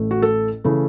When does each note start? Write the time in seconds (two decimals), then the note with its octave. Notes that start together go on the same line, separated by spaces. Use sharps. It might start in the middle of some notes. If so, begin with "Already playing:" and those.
Already playing: A1 A2 A3
0.11 F#4
0.22 A4
0.64 C#3 E3 A3